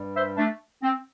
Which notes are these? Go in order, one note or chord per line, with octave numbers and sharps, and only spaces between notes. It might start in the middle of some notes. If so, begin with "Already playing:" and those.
Already playing: G2 G3
C5 E5
A3 D4
C4